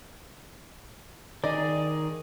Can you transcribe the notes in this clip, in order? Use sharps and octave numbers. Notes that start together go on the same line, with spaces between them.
D#3 G#4 D5 D#5